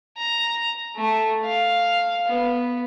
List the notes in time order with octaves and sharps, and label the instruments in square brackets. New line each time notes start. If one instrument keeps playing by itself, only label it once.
[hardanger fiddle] A#5
A3
F5
B3